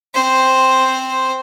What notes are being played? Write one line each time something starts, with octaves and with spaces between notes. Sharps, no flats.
C4 C5